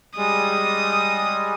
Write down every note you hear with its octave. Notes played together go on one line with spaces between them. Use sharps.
G3 G#3 D#6